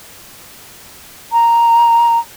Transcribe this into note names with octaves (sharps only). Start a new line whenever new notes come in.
A#5